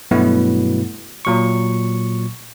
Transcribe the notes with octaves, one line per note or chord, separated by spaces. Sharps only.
G2 B2 F#3 A3 B3 E4
A#2 F#3 C#6